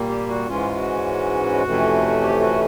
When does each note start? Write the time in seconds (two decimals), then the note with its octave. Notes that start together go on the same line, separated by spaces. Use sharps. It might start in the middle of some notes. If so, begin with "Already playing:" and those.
Already playing: A#2 G3 A#3
0.09 G4
0.27 F#4
0.47 G#2 E3 G#3 C#4 F4
0.76 F#4
1.63 F2 C3 E3 A3 C#4
2.21 G4
2.40 F#4